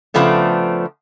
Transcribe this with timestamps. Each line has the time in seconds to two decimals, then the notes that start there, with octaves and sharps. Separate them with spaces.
0.14 C#3 F3 A3 B3 D4